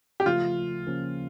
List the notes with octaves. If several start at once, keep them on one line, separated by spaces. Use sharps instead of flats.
G4
C#3 F3 A3 F4
C#3 F3 A#3 C#4